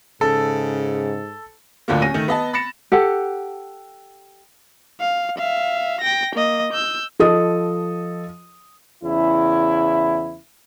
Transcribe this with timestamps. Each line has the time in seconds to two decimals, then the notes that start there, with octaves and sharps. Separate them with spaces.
0.21 G#2 C#3 A4
1.88 D2 A2 D3 F3 A3 A#3
2.02 C#4 A#6 D#7
2.14 D#3 A3
2.28 B3 D#5 A5
2.53 B5 A6 A#6 C#7 E7
2.92 G4 A4 F#5
5.01 F5
5.38 E5 F5
6.01 G5 A#6
6.35 A#3 D#5
6.73 E6 G6
7.19 F3 A4 D#5 D#6
9.04 E2 C#3 E4